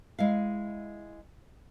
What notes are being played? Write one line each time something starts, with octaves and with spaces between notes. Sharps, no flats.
G#3 E4 F5